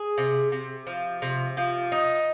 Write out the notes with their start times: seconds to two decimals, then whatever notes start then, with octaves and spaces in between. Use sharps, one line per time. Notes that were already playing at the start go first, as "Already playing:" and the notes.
Already playing: G#4
0.18 C3
0.52 C3
0.87 F3
1.22 C3
1.57 F3
1.92 D#4